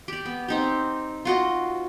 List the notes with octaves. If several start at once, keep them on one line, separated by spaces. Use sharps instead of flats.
G4 D5
B3
C4 D#4 G4
F4 F#4 D#5